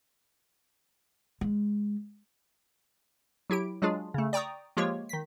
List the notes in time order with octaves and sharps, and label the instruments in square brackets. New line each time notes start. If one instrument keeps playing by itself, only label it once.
[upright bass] G#3
[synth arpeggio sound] F#3 E4 G4 D7
F#3 G#3 D4 F4 G#4
C#3 A3
D5 G5 A#5 C#6 D#6
F3 G#3 A#3 F4 G4 C#5
D#3 B6